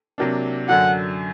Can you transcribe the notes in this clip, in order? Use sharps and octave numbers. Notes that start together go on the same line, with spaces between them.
C3 F#3 A#3 D4
F#2 D3 F#3 F#5